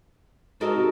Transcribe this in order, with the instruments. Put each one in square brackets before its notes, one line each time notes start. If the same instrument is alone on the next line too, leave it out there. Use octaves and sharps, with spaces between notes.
[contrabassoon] G#2 [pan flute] F#4 [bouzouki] A4 A#4 D#5
[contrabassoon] C3